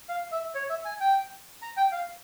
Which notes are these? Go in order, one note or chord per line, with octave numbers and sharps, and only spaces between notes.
F5
E5
C#5
E5
G#5
G5
A#5
G5
F5